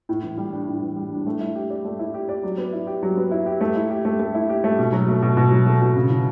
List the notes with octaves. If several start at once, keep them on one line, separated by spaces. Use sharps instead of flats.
A2
E3
G3
D4
A2
E3
G3
D4
A3
E4
G4
D5
A3
E4
G4
D5
F#3
B3
E4
G4
F#3
B3
E4
G4
A3
E4
G4
A3
A3
E4
G4
A3
B2
F#3
A3
B2
B2
F#3
A3
B2
C#3
E3